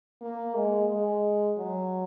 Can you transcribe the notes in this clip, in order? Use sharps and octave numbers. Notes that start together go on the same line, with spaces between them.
A#3
G#3
G#3
F#3